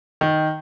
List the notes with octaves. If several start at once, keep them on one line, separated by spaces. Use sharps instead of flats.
D#3